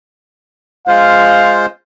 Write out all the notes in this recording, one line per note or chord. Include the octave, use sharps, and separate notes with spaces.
G#3 F4 C5 F5